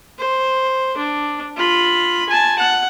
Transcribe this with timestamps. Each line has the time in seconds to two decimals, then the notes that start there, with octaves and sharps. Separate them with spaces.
0.19 C5
0.97 D4
1.57 F4 B5
2.29 G#5 A5
2.59 F#5